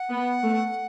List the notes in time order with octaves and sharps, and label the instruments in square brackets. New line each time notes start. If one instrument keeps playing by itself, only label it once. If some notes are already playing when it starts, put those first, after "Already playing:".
Already playing: [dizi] F#5
[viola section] B3
A3